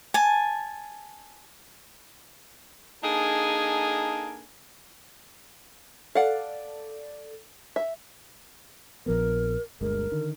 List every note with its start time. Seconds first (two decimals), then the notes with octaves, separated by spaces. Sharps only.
0.14 G#5 A5
3.03 A#3 D4 D#4 G#4 A4 G#5
6.15 A4 D5 F5 F#5
7.76 E5
9.06 A#1 F3 B3 A#4
9.81 G1 D2 G#3 A#4
10.11 D3 D#3